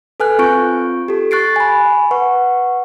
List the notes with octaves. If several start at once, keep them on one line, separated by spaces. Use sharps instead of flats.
A4 B4 G#5 F6 F#6
C4 F4 C#6 G6 D7
G4 A4
C#6 F#6 A6 C7 D7
G#5 B5
B4 F#5 C#6